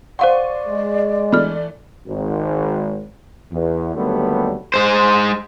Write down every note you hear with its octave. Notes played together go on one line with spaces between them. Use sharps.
C5 D5 F5 F#5 C6 C#6 D#7
G#3
E3 A3 D4 B5 F6
G#1
E2
D#2 D3 F#3 G3 A3 B3
G#3 C5